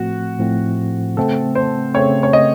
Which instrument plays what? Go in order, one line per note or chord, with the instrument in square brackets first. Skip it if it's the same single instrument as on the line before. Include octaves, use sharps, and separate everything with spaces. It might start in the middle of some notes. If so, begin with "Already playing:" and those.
Already playing: [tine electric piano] A2 F3 A3 C4 [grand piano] F#4
[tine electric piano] A2 F3 A3 C4
[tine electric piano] C#3 A3 C4 [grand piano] A4
[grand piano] C5
[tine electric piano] C#3 A3 C4 [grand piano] C#5
[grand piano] C#5
D#5